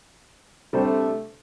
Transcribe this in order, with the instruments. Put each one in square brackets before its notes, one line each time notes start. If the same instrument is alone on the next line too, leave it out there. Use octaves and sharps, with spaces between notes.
[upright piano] C3 G3 D4 A4 C5 [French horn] A3